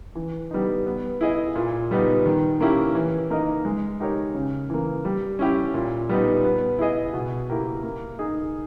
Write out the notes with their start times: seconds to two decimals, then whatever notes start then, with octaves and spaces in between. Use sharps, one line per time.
0.15 E3
0.51 G3 B3 D#4
0.86 B3
1.21 E4 G#4 D#5
1.55 A#2
1.91 G3 B3 D#4
2.26 D#3
2.60 A#3 C#4 E4 G4
2.95 E3
3.30 A#3 D#4 A#4 D#5
3.65 G#3
4.00 D#4 G4 A#4 C#5
4.35 C#3
4.70 E3 A#3
5.05 G3
5.39 C#4 E4 G4
5.74 A#2
6.09 G3 B3 D#4
6.44 B3
6.79 E4 G#4 D#5
7.14 B2
7.50 A#3 E4 G4 A#4
7.83 A#3
8.19 D#4 G#4